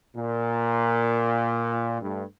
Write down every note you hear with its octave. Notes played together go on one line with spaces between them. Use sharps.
A#2
G2 A3